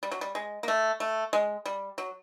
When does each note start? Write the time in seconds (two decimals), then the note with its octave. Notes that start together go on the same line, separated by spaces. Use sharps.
0.03 G3
0.12 F#3
0.21 G3
0.35 G#3
0.63 A#3
0.68 A3
1.00 A3
1.33 G#3
1.66 G3
1.98 F#3